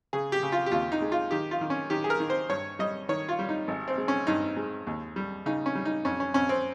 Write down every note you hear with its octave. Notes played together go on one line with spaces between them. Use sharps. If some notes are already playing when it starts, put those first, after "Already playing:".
C#3 G#4
G4
C#3
F4
G4
D#2 F4
D#4
G#3
F4
D#3 G4
F4
D#3
C#4
D#3 G4
G#4
A#4
D#3
C5
G2 C#5
G3 D#5
D#3 C#5
F4
G3
D#4
G#1
C4
G#3
C#4
G2 D#4
G#3
D#2
G3
C#3 D#4
C#4
G3
D#4
F2 C#4
C#4
F2 C#4
C4